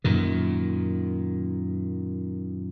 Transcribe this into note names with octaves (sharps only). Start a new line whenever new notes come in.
F#2 A#2 D#3